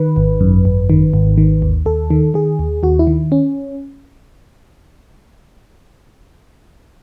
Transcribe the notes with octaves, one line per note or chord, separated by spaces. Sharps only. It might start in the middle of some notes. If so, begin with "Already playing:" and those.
Already playing: D#3 B4
G#1
F#2
G#1
D#3
G#1
D#3
D#2
D#2 A4
D#3
D#3 G#4
D#2
D#2 F#4
E4
D#3
C#4